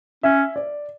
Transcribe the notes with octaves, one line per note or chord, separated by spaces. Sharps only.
C#4 E5
D5